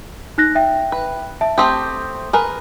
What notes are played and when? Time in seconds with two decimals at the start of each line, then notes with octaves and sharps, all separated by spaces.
0.38 D#4 F#6 A#6
0.55 E5 G5
0.92 B4
1.41 E5 A5
1.58 A3 C4 G4 C6 D#6
2.33 G#4 A#4 B4